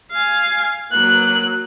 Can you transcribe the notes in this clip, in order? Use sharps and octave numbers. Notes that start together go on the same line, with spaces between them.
F5 G#5
F#3 A#3 F#6